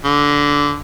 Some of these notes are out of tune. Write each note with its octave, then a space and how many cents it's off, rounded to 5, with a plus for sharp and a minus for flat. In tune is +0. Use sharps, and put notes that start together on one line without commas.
D3 -15